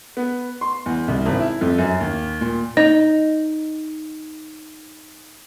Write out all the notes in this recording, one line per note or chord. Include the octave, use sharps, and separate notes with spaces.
B3
C6
E2
C2
G#1
E4
F2
F#2
D#2
A#2
D#4 D#5